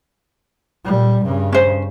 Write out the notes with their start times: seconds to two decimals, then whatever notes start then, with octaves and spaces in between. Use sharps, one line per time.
0.85 A#2 G3
1.23 G2 C#3
1.53 C#4 C5